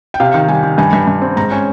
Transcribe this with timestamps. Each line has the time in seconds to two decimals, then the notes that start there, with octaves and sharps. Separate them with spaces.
0.14 G5
0.20 C3 F5
0.34 D#3
0.48 G3 G#5
0.63 D#3
0.78 G2 G#5
0.93 G2
1.08 G2
1.22 C4
1.37 G#2 A#5
1.51 C#4 G#5